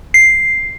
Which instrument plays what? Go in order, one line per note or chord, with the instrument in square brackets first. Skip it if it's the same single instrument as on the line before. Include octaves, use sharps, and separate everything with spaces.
[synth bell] C7